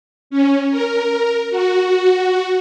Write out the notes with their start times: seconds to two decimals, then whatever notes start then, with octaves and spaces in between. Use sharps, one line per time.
0.30 C#4
0.71 A#4
1.51 F#4